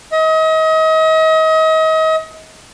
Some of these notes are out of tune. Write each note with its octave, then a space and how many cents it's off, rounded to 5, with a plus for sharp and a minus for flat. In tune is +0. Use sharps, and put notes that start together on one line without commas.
D#5 +35